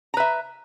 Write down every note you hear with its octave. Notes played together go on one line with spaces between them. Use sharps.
B4 E5 A#5